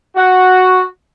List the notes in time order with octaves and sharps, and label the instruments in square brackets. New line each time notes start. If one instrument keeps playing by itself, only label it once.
[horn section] F#4